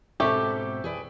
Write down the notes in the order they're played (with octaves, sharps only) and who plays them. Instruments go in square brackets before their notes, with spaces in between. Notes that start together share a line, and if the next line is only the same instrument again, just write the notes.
[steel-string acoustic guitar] G#2 B2 C4 [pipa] G4 [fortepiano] A4 E5 C#6
[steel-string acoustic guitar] G#4 B4 D5